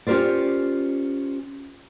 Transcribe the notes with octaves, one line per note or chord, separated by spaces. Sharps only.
C#4 F4 G4 A#4 C5 D5